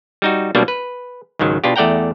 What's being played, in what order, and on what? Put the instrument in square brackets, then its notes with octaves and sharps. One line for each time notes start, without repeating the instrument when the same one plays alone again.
[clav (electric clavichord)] G3 D#4 F#4
B2 F#3 G3 A#3 D4
B4
C#2 G#2 D#3 F#3
B2 D4 F4 G4
E2 A3 D5 F#5 G5 A#5